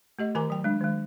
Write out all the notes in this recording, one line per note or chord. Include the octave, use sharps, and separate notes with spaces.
A3 G4 D#5
D#3 A#4 G#5 A#5 D6
F#3 G5
G#3 D4
D#3 G#3